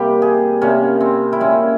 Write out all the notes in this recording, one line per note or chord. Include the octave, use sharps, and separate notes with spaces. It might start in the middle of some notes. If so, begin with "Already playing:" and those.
Already playing: C3 G3 A#3 G4
G#4
C3 G3 A#3 C#4
C4
E4
A#2 G#3 C#4